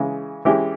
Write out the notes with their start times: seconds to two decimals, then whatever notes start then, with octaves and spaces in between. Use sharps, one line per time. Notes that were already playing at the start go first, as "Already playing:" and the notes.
Already playing: C#3 E3 G#3
0.45 E3 G#3 C#4 E4 G4